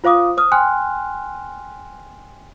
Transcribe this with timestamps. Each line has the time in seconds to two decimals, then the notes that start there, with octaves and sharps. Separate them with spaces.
0.04 F4 C5 F5 D6 D#6
0.37 C5 D#6 F6
0.52 G5 G#5 C6 F6 F#6